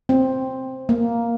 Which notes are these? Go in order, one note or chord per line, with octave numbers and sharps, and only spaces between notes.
C4
A#3